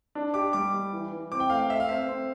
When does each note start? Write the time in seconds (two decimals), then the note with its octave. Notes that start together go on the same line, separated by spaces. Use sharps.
0.15 D4
0.34 G4 D6
0.53 G3 D6
0.74 G3
0.93 E3
1.12 E3
1.32 C4 D6
1.40 G5
1.50 A3 F5
1.60 F5
1.69 A3 E5
1.80 F5
1.89 C4 E5
2.08 C4